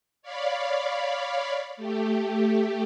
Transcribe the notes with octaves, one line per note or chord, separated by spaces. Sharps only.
C#5 D5 F5 B5
A3 G4